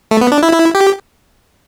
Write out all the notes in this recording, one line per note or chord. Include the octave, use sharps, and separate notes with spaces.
A3
B3
D4
E4
E4
G4